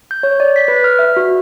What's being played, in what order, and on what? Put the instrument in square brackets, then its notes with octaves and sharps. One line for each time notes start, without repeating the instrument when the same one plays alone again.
[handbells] G6
C#5
D5
B6
B4
F6
E5
F#4